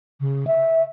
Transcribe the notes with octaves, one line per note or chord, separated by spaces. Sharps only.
C#3
E5